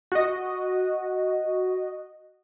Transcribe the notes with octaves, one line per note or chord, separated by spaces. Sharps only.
F#4 D#5